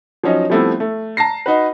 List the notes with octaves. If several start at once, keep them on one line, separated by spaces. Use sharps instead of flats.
F3 F#3 C#4 D#4
F3 G3 A3 B3 C4 E4
A3
A5 A#5 A#6 C7
D#4 F#4 B4